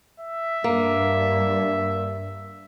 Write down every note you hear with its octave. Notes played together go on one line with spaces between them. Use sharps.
E5
G2 A#3